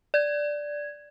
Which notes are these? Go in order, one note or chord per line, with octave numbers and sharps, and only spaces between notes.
D5 G#6